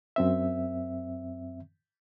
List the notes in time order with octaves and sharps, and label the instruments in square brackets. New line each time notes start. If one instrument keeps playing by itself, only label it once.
[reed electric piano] F#2 C4 E5